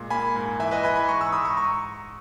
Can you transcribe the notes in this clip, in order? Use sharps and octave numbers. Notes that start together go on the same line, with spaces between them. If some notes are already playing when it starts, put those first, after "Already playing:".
Already playing: A#2 G#3
A#3 G#5 B5
G#2
E3 E5 G#5
B4 D#5
E3 G#5 B5
G#5 B5
G#2 A#5 C#6
C#6 E6
G#2 B5 D#6
A#5 C#6
A#5 C#6